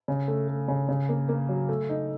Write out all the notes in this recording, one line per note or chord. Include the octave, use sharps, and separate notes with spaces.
C#3
A3
A3
C#3
C#3
A#3
A#3
F#3
A3
D#4